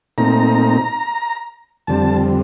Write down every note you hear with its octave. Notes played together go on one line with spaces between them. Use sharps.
A#2 A3 C4 D#4 A#5
F2 D3 G3 C4 A5